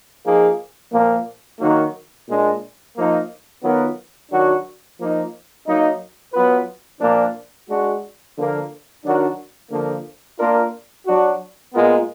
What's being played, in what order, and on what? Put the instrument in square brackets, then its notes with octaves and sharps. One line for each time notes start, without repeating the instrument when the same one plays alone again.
[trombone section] F3 A#3 D#4 G#4
A#2 F3 A#3
D#3 F#3 A#3 D#4 F#4
A#2 G#3 D4
F3 A#3 D#4
D#3 F#3 B3 F4 A#4
D#3 F#3 D4 F#4
F3 A#3 D#4
F#3 A#3 D#4
F#3 B3 F4 B4
A#2 F3 A#3 D4
G#3 D4 F#4
D3 F3 A#3
D#3 F#3 D4 F#4 A#4
D3 F3 A#3
A#3 D4 F4 A#4
F#3 D4 F#4
A#2 G#3 B3 F4 A#4